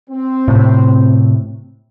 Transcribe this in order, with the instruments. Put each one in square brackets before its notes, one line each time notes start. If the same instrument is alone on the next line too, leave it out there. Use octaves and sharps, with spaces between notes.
[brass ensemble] C4
[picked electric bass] A2 C3